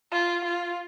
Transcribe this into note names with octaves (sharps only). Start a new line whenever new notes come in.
F4
F4